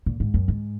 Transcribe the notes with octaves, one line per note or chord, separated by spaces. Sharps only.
A#2
G#2
F#2
G#2